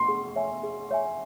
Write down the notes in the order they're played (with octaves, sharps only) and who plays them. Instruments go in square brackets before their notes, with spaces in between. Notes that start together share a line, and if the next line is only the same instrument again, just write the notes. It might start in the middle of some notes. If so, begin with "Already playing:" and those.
Already playing: [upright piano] C6
[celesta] G#4
C#5 E5 G#5
G#4
C#5 E5 G#5